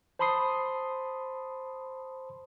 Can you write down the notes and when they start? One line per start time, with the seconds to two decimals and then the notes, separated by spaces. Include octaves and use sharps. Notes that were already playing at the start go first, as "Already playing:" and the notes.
0.19 C5 A5 B5 C6 D#6 C7